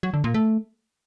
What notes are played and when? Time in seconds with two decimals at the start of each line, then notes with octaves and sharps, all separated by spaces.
0.03 F#3
0.14 D3
0.24 A#2
0.34 A3